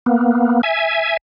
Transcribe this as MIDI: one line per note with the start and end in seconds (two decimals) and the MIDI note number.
0.06 0.61 58
0.06 0.61 59
0.63 1.17 76
0.63 1.17 80